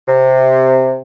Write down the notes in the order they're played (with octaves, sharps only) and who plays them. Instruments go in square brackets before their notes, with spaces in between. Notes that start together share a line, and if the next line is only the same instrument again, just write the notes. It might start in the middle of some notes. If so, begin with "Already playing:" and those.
[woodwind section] C3